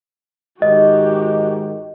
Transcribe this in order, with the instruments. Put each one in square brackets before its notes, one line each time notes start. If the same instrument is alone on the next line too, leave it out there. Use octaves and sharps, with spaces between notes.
[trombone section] G#2 D#3 [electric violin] F#4 G4 [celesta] D#5